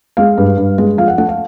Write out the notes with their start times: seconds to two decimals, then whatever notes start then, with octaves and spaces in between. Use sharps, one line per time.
0.17 G#3 F5
0.38 G2
0.57 G2
0.78 G#3
0.98 F3 F5
1.08 F#5
1.18 A3 F#5
1.29 F5